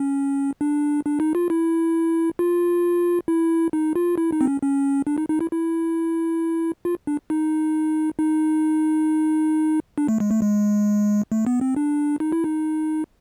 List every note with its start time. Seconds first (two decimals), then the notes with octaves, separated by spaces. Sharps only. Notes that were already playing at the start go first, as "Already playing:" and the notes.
Already playing: C#4
0.61 D4
1.05 D4
1.20 D#4
1.35 F4
1.50 E4
2.39 F4
3.28 E4
3.73 D#4
3.96 F4
4.18 E4
4.32 D#4
4.41 C4
4.48 C#4
4.62 C#4
5.07 D4
5.18 D#4
5.29 D#4
5.41 E4
5.51 E4
6.85 F4
7.07 D4
7.30 D#4
8.19 D#4
9.98 D4
10.08 A3
10.20 G#3
10.31 A3
10.42 G#3
11.32 A3
11.47 B3
11.61 C4
11.76 D4
12.20 D#4
12.32 E4
12.44 D#4